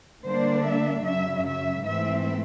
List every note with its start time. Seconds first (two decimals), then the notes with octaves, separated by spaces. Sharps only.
0.24 D3 G3 A#3 D4 C5
0.64 E5
1.04 F#2 C#3 F#3 E5
1.45 E5
1.84 G#2 E3 A3 C4 E5